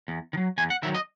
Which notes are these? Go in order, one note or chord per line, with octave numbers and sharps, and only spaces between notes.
E2
D#3
F#3
E2 G#5
F#5
D#3 F#3 E5
D#5